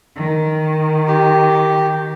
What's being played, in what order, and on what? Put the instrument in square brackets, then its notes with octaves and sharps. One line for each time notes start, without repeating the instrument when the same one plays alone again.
[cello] D#3
[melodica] G4